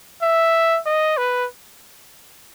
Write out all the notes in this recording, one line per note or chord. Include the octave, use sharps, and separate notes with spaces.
E5
D#5
B4